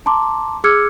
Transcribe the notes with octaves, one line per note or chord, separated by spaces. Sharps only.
A5 A#5 C6 D6
G#4 D6 E6 F6 G#6 C#7